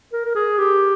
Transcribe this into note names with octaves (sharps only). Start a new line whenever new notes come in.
A#4
A#4
G#4
G4